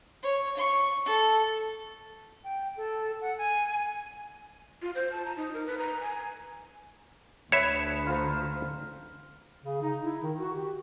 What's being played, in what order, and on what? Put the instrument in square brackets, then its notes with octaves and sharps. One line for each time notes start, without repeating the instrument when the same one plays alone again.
[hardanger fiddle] C#5
C#6
A4
[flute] G5
A4
F#5
G#5
[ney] F4
C5
A5
A#5
D#4
A#4
B4
A#5
G#5
[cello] D2 [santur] B4 [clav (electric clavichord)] C#5 E5
[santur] F4 C5 A#5
[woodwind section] C#3
D#4
E4
D#3
F#4
G4